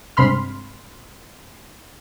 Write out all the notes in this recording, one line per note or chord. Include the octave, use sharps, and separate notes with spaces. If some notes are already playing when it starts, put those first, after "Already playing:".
G2 C3 G#3 B5 C6 F6